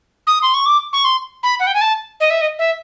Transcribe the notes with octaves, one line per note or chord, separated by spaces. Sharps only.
D#6
C6
C#6
D6
C#6
C6
B5
F#5
G5
G#5
A5
D#5
E5
D#5
E5